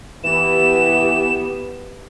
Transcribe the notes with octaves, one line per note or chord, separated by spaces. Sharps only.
E3 B3 G4 E7